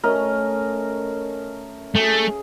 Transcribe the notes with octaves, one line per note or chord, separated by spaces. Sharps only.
A3 C#4 A#4 D#5
A3 G#4